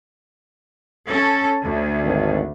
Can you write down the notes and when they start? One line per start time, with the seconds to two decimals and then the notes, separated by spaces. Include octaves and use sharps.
1.07 C#4 A4
1.62 D2
2.04 G#1